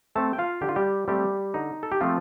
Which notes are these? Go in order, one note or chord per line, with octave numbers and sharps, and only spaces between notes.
A3 C4 A4 A5
G5
F4 F5
D3 G4
F4
G3 G4
G3 A3 C4 G4
D3 D#4
A4
G4
F3 A3 C4 F4